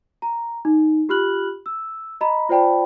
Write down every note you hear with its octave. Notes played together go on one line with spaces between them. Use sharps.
A#5
D#4
F4 G4 B5 F6 F#6 F#7
E6
D#5 A#5 B5
F4 C5 D5 G5 A5 B5